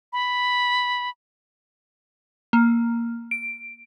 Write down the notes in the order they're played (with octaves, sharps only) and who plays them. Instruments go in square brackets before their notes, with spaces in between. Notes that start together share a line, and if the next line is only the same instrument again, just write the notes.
[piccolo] B5
[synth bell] A#3
D7